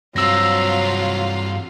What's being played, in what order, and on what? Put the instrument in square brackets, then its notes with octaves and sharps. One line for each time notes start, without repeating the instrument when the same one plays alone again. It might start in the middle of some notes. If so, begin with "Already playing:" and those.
[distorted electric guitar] G2 C4 [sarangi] F#3 [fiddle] F4 F5 [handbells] E6 A#6